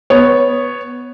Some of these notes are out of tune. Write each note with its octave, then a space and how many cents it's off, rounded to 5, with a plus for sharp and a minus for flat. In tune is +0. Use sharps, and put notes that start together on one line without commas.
B3 +0 C#5 +0